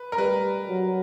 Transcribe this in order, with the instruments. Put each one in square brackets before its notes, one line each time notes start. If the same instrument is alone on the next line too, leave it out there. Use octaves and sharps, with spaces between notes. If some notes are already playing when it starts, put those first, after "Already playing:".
Already playing: [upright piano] B4
A#4
[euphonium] G3 [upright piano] B4
[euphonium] F#3